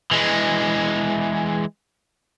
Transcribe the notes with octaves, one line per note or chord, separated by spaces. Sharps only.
E3 G#3